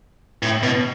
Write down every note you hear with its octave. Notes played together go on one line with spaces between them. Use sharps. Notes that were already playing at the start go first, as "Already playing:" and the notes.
A2
B2